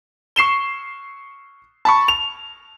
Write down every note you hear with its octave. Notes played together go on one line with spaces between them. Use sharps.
C#6 C7 E7 G7
A5 B5 C#6
F7